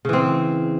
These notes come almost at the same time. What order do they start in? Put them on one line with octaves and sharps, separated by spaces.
C#3 E3 C4